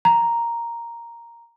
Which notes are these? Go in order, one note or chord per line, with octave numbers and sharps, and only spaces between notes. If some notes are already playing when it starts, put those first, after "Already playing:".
A#5